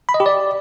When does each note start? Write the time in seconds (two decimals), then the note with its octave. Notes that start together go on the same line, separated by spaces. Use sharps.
0.09 B5
0.14 D#5
0.20 G4
0.26 D5